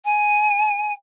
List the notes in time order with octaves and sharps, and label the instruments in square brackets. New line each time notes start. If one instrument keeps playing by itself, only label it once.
[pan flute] G#5